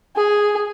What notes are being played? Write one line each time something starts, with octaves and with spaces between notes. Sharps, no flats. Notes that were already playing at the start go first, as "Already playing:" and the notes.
G#4